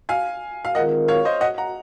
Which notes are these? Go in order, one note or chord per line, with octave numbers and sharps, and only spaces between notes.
F5 G#5
F5
D#3 G#3 C4 F4 A#4 D#5 F#5
C#5 F5
C5 D#5
D#5 F#5
F#5 A#5